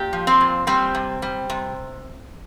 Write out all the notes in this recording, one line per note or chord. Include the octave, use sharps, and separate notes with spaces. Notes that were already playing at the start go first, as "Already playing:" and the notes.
Already playing: A#2 G4
F3
C4
A#2
G3 C4
C3
G3
C3